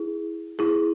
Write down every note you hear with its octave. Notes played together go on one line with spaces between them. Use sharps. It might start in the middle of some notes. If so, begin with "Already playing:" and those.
Already playing: E4 G#4
E4 G#4